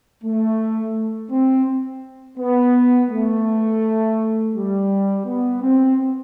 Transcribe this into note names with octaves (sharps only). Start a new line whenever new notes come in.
A3
C4
B3
A3
G3
B3
C4